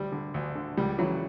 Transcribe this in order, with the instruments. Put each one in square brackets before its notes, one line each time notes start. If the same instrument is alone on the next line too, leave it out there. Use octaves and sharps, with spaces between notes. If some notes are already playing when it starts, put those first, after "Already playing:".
Already playing: [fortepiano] D2 G3
D3
D2
D3
C#2 G3
C#3 E3 F#3